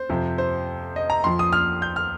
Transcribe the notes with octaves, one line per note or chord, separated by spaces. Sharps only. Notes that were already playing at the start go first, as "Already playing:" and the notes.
Already playing: C5
F2 C3 F3
C5
D#5
A#5
F2 F3 C6
D#6
F6
G6
F6